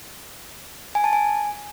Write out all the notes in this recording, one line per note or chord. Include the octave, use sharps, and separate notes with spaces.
G#5
A5
G#5